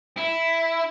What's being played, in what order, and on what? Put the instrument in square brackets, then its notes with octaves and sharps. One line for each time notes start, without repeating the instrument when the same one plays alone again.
[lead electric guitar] E4